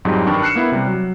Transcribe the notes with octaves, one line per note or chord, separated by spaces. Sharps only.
F2 G#2 F#3 G3
G2 D#3 D4 D5 G5 C#6
F6 F#6 C7 C#7 E7
A#3 B3 E4
C3 G3
F#3